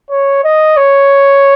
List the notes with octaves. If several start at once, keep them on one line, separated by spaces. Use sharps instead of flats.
C#5
D#5
C#5